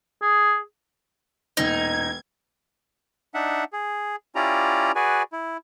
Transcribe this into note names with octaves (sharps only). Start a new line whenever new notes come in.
G#4
E1 A#2 D#4 G#6
D4 D#4 E5 F#5
G#4
C#4 E4 F4 G4 D5 A#5
F#4 G#4 B4 D5 G#5
E4